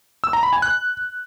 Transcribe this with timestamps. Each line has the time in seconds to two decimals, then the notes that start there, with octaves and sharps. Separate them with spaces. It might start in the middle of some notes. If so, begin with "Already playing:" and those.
0.24 E6
0.33 A#5
0.43 B5
0.53 G#5
0.62 F#6